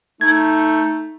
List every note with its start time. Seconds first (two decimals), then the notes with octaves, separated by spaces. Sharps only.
0.21 A3 D#4 G#6